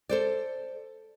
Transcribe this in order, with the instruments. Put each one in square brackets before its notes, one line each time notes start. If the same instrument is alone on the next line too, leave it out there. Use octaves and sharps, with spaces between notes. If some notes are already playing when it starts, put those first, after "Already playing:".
[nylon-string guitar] A4 C5 D5